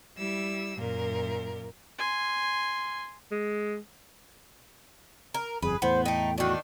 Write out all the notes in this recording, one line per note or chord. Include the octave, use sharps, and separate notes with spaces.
G3 E4 E6
F#2 A#2 A#4
G#5 C6
G#3
A#4
G1 F2 G#4 B4
E2 A2 B3 C5
A3 D#4 G5
D#3 D4 F#4